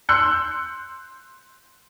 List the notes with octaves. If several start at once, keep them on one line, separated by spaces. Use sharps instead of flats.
C6 E6 F#6 G6 C#7